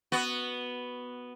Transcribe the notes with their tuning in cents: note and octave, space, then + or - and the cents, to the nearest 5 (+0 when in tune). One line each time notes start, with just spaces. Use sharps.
B3 +0 F#4 +0